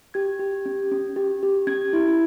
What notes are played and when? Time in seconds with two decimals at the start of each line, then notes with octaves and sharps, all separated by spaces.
0.14 G4 G#6
0.39 G4
0.66 C#4
0.92 C#4
1.16 G4
1.43 G4
1.67 C#4 G#6
1.93 E4